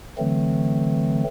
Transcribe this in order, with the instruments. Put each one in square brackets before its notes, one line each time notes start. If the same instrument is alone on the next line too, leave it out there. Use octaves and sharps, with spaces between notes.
[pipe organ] D3 E3 F#3 A3 C4